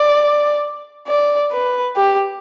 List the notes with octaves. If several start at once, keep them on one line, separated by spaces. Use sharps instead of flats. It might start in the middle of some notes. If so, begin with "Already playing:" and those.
Already playing: D5
D5
B4
G4